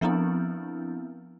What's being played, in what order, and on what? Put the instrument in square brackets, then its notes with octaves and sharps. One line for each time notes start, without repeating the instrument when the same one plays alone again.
[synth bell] F3 B3 C4 D4 E4